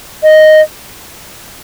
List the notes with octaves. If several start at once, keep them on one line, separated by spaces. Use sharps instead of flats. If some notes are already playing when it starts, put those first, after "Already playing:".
D#5